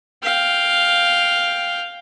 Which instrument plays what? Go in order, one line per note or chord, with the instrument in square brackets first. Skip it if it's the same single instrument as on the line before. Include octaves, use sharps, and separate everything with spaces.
[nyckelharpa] F5 G5